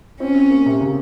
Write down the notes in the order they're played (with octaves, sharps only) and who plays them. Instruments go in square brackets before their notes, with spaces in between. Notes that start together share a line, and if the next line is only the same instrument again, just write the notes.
[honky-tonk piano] C4 [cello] C#4
[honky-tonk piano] C4
A#3
C3
C#3